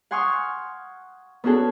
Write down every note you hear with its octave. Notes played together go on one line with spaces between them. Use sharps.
F#5 G#5 C6 C#6 D#6 F6
B3 C#4 D4 F#4 G#4 A4